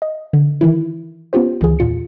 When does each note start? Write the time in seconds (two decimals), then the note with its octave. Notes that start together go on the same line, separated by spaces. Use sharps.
0.02 D#5
0.33 D3
0.61 D#3 E3 E4
1.33 B3 C#4 F4 G4 C5
1.61 C#2 D#3 E3 G#4
1.79 E2 A#2 F4 C#7